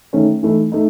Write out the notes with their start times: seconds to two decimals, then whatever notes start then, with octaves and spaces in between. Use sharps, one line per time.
0.13 D#3 A3 C#4
0.43 E3 A3 D#4
0.72 A3 D#4